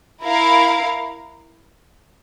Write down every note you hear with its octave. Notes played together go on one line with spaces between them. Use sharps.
E4 A#4 F5